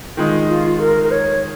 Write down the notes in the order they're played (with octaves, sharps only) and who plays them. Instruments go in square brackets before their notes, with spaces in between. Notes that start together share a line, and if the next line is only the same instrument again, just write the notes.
[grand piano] D#3 G#3 D#4 [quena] F4
[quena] F4
A#4
A#4
C#5